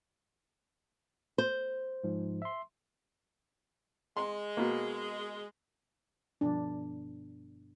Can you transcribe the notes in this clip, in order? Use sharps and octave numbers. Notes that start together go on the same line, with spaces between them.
C5
G#2 F3
E5 C6
G#3 C6
B2 A#3
G1 B2 F3 D4